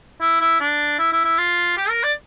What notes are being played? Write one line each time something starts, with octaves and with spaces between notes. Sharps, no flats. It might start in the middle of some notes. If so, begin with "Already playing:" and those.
E4
E4
D4
E4
E4
E4
F4
G4
A#4
D5